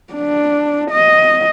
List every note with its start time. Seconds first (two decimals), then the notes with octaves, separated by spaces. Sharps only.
0.14 D4
0.91 D#5